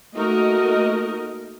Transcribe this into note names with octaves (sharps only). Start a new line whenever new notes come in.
A3 A#3 D#4 F#4 A#4 D#5